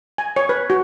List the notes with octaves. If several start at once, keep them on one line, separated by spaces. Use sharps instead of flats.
G#5
C#5
B4
F#4